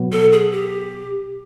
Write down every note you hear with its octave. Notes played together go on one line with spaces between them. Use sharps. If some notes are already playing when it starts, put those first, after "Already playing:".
Already playing: B2 F#3 B3
A4
G#4
G4